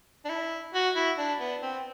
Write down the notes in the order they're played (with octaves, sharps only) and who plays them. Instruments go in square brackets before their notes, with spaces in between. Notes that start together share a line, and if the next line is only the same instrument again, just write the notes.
[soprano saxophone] D4
E4
F#4
E4
D4
B3
C4